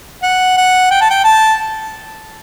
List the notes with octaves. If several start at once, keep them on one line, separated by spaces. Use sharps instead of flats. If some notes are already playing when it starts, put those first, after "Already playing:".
F#5
F#5
G5
A5
G5
A5